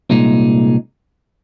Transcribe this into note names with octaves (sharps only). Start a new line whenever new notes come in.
C2 A#2 G#3 D#4